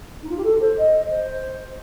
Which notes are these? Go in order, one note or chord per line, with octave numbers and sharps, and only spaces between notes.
D#4
F4
G4
A4
C5
D#5
C5